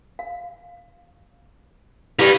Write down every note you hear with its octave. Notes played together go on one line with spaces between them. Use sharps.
F5
E4 G4 B4 D5 F5